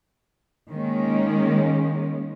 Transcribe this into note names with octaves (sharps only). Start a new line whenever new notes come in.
D#3 G#3 A#3 C#4